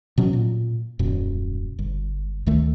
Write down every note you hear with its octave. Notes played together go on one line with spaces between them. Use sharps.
B2 F#3 C#4
A#2
D#1 F#2 B2
G1
D2 D#3 A3